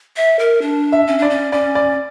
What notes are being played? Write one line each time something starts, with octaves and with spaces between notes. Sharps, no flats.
E5
A#4
D4
E5
C#4
D4 D5
C#4
C#4 D5
D5